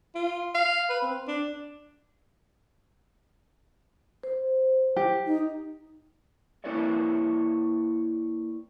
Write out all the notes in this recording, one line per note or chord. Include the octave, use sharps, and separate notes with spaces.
F4
F5
B4
C4
D4
C5
G4
D#4
A#3 E4 B4 C#5 D5 E5